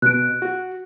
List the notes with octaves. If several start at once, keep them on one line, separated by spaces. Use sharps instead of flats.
B2 F#6 D7
F#4